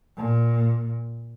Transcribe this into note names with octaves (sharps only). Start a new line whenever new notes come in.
A#2